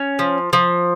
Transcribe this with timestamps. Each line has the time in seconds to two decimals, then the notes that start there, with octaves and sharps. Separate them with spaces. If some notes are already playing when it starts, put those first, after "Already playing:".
Already playing: C#4
0.19 F3
0.53 F3